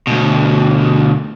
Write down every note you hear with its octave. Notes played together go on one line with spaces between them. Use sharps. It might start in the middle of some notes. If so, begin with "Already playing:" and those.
D2 B2